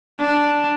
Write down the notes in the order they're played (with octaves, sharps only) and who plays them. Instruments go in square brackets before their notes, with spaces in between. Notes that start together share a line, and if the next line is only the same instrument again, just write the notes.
[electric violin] D4